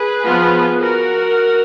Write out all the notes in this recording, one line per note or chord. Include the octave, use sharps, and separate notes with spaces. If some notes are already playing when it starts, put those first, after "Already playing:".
Already playing: G#4 B4
F3 B3 F4
F#4 A#4